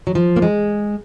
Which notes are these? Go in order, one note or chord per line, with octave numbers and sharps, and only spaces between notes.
F#3
F3
A#3
G#3